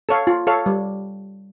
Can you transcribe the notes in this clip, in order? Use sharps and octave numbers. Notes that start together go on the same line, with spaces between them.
A4 C#5 F5
F4
A4 C#5 F5
G3